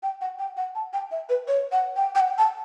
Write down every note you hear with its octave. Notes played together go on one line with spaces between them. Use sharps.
G5
F#5
G5
F#5
A5
G5
E5
B4
C#5
F#5
G5
G5
F#5
A5